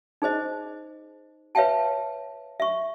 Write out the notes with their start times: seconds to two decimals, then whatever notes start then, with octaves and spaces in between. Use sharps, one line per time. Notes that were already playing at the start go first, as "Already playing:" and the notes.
0.22 D#4 G#4 C5 D#5
1.55 B4 C#5 E5 F5 G5 A5
2.60 E5 C#6